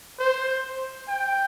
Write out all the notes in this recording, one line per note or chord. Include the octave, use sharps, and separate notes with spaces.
C5
G5